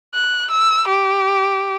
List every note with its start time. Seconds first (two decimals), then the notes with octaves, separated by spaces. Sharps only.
0.15 F#6
0.51 E6
0.88 G4